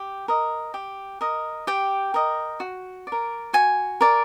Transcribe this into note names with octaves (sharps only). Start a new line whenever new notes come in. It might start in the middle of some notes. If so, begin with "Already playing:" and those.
Already playing: G4
A#4 D#5
G4
A#4 D#5
G4 G5
A#4 D#5
F#4
D5
A#4
F#4 G#5
A#4 D5